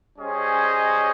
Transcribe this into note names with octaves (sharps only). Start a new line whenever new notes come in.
G3 C#4 G#4 C5 D#5